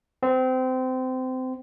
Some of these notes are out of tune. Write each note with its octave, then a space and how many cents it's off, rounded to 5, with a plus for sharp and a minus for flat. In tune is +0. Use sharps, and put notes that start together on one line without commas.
C4 -25